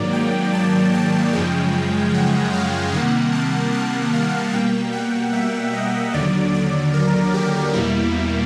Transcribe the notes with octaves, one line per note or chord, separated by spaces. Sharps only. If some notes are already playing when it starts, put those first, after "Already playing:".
Already playing: G#2 D#3 F#3 A#3 D5
G5
A5
A5
F#2 C#3 F3 G#3 G5
F#5
F5
C3 D#3 G3 A#3 F#5
A5
A5
F5
B2 G3 A#3 G5
F#5
E5
D#5
D#2 D3 F#3 D5
D5
A#4
G4
E2 B2 G3 A#3 E4